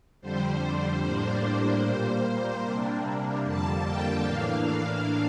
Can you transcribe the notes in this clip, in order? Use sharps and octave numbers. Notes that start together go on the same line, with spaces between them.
F2 D3 G3 C5
A2 G3 A#3 D4 C5
A#2 G3 A#3
C3 G3 A#3 D4
F2 D3 G3 A#3 A5
G5
A2 E3 A#3 D4 F5